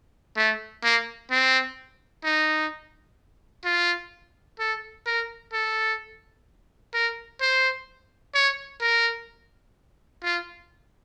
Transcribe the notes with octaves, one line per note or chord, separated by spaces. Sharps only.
A3
A#3
C4
D#4
F4
A4
A#4
A4
A#4
C5
C#5
A#4
F4